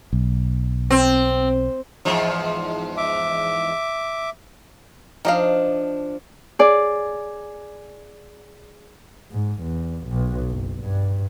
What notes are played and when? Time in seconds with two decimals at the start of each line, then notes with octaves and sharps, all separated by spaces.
0.13 B1
0.90 C4
2.05 E2 G#2 F3
2.97 E5 D6
5.25 F3 D4 D#4 D#5 F5
6.59 G#4 D5
9.32 G#2
9.62 E2
10.07 B1
10.50 F#1
10.81 G2